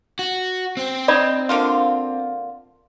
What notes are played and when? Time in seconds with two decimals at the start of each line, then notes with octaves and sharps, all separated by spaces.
0.19 F#4
0.77 C4 C5
1.08 D#4 D5 B5
1.49 D3 A#3 F4